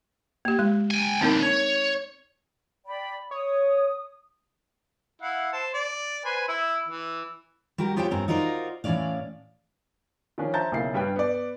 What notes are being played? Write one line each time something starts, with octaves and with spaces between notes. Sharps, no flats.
A#3 G4
G#3
G5 G#5
D#2 C4 D4 D#4 A#4
C#5
D5 G5 B5
C#5 D#6
E4 F5 F#5
C5 A5
D5
B4 C5 G#5
E4 E6
E3
G3 F#4 G4 A#4
B3 F4 G4 C5 C#5 G5
G2 C4 C#4 A#4
D#4 F4 F#4 A#4 C5 D5
A2 E3 G#3 C#4 D5 F5
D#3 F3 C#4 D4
C5 E5 A5 A#5 G6 A6
B1 C#3 A#3 E4 C7
G2 G3 B4 G5
B3 D5